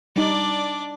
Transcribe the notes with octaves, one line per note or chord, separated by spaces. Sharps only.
G3 D4 D#4 D5